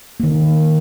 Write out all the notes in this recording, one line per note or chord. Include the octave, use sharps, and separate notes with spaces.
D#3 A#3